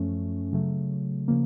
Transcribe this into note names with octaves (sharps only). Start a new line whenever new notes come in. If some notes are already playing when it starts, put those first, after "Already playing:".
Already playing: F#2 F3 A3 C#4
C#3 F#3 A3
C#3 F3 A#3